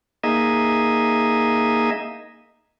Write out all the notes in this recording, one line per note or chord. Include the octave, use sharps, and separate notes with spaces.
A#3 D#4 G#4 D#5 E5